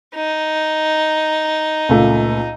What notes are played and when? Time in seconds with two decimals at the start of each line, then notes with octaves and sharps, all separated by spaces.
0.15 D#4
1.89 C#2 A#2 A3